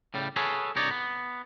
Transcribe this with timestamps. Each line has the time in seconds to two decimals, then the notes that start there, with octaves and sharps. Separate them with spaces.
0.14 A2 C#3 G3
0.36 G#4 A4 B4 C#5 F5
0.76 C2 G2 D#4 C#5 D5
0.90 B3